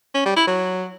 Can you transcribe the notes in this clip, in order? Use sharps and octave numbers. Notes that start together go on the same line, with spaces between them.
C#4
G3
E4
F#3